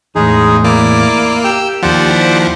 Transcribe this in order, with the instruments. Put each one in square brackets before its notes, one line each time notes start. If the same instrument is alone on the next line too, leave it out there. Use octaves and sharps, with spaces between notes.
[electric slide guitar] E2 A2 [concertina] G#3 D#4 G#4
[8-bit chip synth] A#3 [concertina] E4 D5 D6
[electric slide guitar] G4 [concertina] G5 E6
[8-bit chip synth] D#2 F3 [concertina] C5 D5 F#5
[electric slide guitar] E4